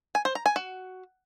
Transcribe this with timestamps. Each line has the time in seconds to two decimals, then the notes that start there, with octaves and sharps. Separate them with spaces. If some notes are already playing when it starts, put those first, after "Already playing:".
0.15 G#5
0.25 C5
0.35 A#5
0.46 G#5
0.56 F#4